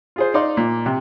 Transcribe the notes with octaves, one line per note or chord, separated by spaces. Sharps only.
F4 G#4 C5
D#4 D5 F5 C6
A#2
C3